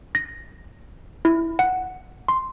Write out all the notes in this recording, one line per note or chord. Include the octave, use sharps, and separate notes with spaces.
A#6
E4
F#5
C6